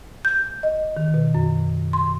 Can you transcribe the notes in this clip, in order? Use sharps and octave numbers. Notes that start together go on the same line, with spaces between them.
G6
D#5
D#3
B2
F#2
C6